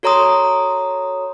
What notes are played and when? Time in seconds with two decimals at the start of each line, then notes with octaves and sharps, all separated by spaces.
0.03 F#4 A4 C#5 A#5 C6 D#6